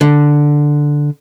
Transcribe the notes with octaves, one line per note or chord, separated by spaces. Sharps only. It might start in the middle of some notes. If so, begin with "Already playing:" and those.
D3